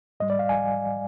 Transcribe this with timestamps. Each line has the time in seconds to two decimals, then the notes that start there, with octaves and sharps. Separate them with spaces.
0.20 G#2 G3 D#5
0.30 D5
0.39 F5
0.49 G#5